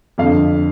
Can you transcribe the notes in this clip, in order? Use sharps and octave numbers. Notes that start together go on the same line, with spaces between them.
F2 D3 F5